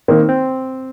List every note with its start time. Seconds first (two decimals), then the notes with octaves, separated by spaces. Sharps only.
0.08 D#3 A#3 C4 D#4
0.29 C4